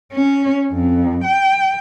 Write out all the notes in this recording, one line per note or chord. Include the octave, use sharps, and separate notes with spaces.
C#4
F2
G5